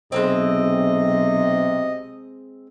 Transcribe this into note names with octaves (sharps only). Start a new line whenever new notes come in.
B1 C3 G#3 A#3 C4 D#5